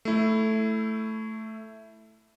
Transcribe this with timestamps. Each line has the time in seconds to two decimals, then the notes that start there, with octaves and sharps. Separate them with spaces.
0.05 A3 E4